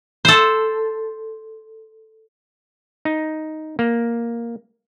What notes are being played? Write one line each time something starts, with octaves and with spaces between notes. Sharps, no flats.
A4 C5
D#4
A#3